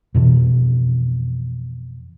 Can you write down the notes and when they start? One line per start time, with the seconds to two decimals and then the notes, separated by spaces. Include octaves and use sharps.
0.15 F2 B2 E3